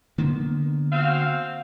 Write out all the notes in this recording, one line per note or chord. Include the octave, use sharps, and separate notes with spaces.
D3 A#3 B3
C4 F#4 F5